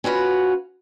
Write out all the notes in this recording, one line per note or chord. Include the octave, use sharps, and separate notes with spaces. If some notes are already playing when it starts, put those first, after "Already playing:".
C#4 F4 F#4 B4